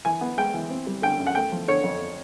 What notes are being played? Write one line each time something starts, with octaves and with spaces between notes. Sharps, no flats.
E3 G#5
B3
G#3 G5
E3
C4
G3
D3 G5
F#2
F#5
A3 G5
F3
D3 C#5
F2